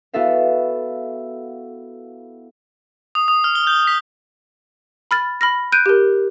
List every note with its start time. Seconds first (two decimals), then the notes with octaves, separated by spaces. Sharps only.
0.13 B3 E4 F#4 A4 E5 F5
3.15 D#6
3.28 D#6
3.44 F6
3.55 G7
3.67 G6
3.87 B6
5.11 B5 F6 A6
5.41 B5 F6 A#6
5.72 F#6 G6 D7 D#7
5.86 G4 A#4